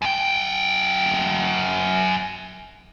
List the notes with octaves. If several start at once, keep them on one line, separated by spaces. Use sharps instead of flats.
F#2 G5